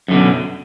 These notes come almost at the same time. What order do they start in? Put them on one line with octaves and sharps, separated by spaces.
F#2 D3 B2